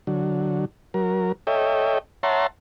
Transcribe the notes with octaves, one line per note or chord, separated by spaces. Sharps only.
D3 F#3
F#3 A#4
A4 C#5 D#5 E5 G5
C#5 E5 F#5 A5 A#5 C6